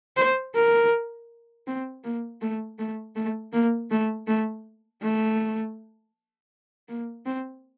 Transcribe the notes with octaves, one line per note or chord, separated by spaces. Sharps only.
C5
A#4
C4
A#3
A3
A3
A3
A#3
A3
A3
A3
A#3
C4